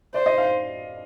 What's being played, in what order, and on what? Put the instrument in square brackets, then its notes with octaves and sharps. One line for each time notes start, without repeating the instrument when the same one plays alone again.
[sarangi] C5 [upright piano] D5
[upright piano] D#5
F5